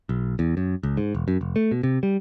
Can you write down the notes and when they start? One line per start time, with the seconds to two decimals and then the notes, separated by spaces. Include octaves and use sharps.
0.09 B1
0.39 E2
0.57 F#2
0.83 C#2
0.97 G#2
1.15 E1
1.28 F#2
1.41 F1
1.56 A3
1.72 B2
1.83 C3
2.03 G3